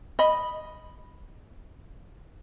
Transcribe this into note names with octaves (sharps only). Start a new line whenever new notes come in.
D#5 B5